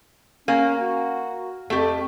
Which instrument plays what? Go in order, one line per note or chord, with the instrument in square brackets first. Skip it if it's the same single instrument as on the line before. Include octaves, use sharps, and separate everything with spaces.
[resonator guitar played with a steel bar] A#3 [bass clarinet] C#4
[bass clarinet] F#4
[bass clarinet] F2 [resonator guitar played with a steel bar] A3 G4